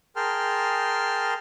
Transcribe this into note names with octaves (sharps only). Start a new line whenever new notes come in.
G#4 A#4 G5 A5 C6 F6